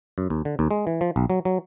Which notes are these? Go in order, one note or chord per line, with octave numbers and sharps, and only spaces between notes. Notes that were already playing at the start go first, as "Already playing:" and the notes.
F#2
D#2
D3
D#2
G#3
E3
F3
B1
F#3
F#3